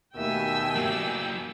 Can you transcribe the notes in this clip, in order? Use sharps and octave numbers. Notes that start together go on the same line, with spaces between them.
D#2 B2 D#3 A3 E5 G5 G#5 E6
G2 F#3 A#3